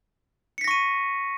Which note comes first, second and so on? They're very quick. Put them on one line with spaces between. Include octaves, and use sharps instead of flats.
C#7 B6 A#6 C#6 D#7